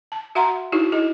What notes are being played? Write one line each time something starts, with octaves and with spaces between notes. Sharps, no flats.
A5
F#4 E5 F#5 A#5 C6
D#4 E4 F#4 G#4
E4 G#4 D#5